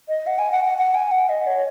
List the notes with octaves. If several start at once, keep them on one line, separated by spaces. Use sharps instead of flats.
D#5
F#5
G#5
F#5
F#5
F#5
G#5
F#5
D#5
C#5